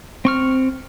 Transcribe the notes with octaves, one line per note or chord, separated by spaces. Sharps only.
C4 C#6 F6